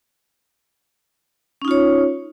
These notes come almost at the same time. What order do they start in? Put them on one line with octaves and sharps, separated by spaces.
C#4 D#4 F4 C#5